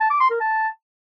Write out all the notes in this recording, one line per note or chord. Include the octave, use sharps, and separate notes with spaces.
A5
D6
C6
A#4
A5